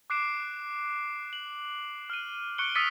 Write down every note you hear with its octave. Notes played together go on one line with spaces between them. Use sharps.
D6 F#6 C7 D7 E7
F#7
F6 D#7
C#6 F#6 C#7 D7 G7
D#6 E6 A6 B6 C#7 D#7